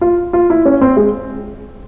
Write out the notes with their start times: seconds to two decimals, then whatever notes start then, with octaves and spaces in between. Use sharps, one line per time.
0.01 F4
0.33 F4
0.50 E4
0.65 C#4
0.81 C4
0.97 G#3